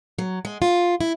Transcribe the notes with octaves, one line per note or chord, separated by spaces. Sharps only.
F#3
G#3
F4
E4